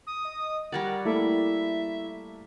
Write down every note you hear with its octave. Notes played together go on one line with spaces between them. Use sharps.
D#6
D#5
G3 A#4 C#5 D5 F#5
A3 A#3 E4 A4 E5